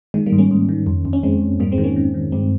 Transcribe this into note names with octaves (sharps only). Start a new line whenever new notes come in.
D#3 G#3
G3 A#3
G#2
A#3 C#4
G#2
D#3
F2
F2
C#4
F2 G#3 C4
F2
G#2 G3 A#3
G#3 C4
D#3
A#3 C#4
D#3
D#3
G2 G#3 C4